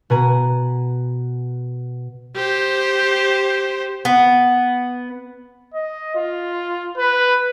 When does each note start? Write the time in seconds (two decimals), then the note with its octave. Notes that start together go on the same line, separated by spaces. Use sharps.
0.10 B2 B4 G#5 A#5
2.36 G4 C5
4.05 B3
5.74 D#5
6.16 F4
6.98 B4